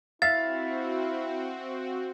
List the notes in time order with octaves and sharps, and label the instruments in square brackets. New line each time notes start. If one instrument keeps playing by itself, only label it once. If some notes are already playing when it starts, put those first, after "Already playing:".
[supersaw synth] C4 F#4 [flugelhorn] E4 [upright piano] E5 F5 [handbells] A6